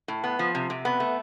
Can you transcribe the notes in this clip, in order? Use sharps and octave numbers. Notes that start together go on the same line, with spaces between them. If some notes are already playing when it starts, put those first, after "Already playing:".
A2
B3
F3
C3
C3
B3
A3